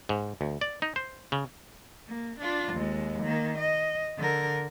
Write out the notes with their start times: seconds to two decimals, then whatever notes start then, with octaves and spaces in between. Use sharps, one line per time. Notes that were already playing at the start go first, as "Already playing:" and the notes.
0.09 G#2
0.41 D2
0.61 D5
0.82 D#4
0.96 C5
1.32 C#3
2.08 A#3
2.40 D4 F4
2.73 D#2 G#3
3.23 D#3 A#3
3.58 D#5
4.17 D3 A#4